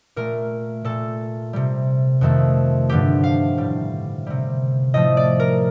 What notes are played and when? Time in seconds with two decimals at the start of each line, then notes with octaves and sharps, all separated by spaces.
0.16 A#2 A3 A#4
0.85 A#2 A3 A4
1.53 C3 G3
2.21 F2 D#3 A3
2.89 G2 D3 F3 A3 G4
3.24 F5
3.58 A2 G3
4.27 C3 G3
4.94 A2 F3 A3 D#5
5.17 D5
5.40 A#4